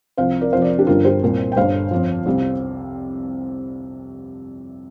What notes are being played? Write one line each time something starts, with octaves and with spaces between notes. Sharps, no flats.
C2 C3 F3 C5 F5
A#4 D5
F2 C3 F3 C5 F5
A#4 D5
D4 G4
G1 G2 D3 G3 F4 A#4
G4 C5
C2 A#2 G3
G5
G1 G2 D3 G3 C5 F5
F2 F3
C2 C3 G3